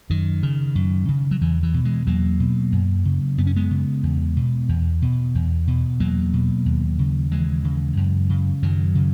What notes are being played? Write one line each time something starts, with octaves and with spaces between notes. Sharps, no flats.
F#2 D#3
C#3
F#2
C#3
F#3
E2 E3
E3
B2
E3 G#3
E2 F#3 A#3
B2
F#2
C#3
F#2 B3
C#4
G#3 B3
C#3
E2
B2
E2
B2
E2
B2
E2 F#3 A#3
B2
D#2
C#3
D#2 E3 G#3
C#3
F#2
C#3
F#2 D#3 F#3
C#3